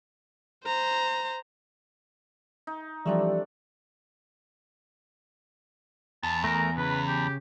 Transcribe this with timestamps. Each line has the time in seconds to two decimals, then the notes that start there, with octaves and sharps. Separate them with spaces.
0.65 C5 A#5
2.67 D#4
3.06 E3 F3 G3 A3 C4 D4 G4 D5
6.23 E2 A5
6.44 A3 A#4 A#5
6.77 C#3 B4
7.08 G4